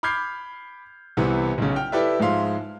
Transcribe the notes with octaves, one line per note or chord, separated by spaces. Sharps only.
B5 D6 F6 G6 G#6 C7
C2 C3 E3 B3
B1 C#3
G5 F6
E4 G4 A4 B4 D5 E5
G#2 F3 G#3 E5 F5 C6